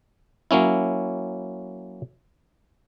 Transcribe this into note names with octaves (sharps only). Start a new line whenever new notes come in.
F#3 A#3 C#4 E4